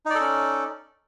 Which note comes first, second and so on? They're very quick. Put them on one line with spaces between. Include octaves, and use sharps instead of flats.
D#4 D5 A4 C#4